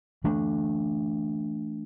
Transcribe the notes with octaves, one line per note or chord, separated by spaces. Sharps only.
E3 A3 D4